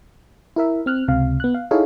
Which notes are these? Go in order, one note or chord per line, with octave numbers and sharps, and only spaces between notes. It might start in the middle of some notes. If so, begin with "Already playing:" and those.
E4 A#4 E5
C4 F6 F#6
C#2 C3 F5
B3 F#6
F5
D#4 E4 G#4 A4 C#5 F5